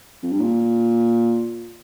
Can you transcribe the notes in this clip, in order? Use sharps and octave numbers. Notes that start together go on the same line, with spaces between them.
F2
G2
A#2